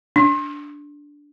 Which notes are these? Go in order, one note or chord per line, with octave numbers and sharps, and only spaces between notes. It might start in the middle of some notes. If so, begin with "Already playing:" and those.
D4